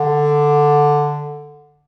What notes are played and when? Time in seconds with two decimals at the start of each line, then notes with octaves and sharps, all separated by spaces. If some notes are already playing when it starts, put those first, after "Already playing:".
Already playing: D3